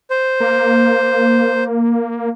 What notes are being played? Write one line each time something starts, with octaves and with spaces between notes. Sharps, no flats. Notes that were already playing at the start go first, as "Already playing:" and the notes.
C5
A#3